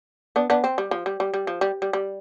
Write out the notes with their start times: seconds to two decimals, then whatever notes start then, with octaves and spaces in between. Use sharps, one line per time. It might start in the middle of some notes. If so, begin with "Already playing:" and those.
0.36 B3 D4
0.50 B3 D4
0.64 C4
0.78 G3
0.91 F3
1.06 G3
1.20 G3
1.34 G3
1.47 F3
1.61 G3
1.82 G3
1.93 G3